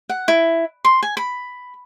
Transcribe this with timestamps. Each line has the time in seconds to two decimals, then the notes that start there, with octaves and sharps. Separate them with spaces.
0.09 F#5
0.28 E4
0.85 C6
1.03 G#5
1.17 B5